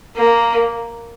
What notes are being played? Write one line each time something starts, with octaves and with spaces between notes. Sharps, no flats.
A#3